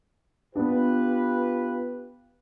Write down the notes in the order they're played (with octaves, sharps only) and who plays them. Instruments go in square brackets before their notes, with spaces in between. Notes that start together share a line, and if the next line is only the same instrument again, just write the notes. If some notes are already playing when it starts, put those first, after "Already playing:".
[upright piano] B3 D4 [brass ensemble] F4 G4 B4